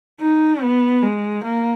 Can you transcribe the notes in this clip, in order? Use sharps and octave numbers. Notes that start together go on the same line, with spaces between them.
D#4
B3
G#3
A#3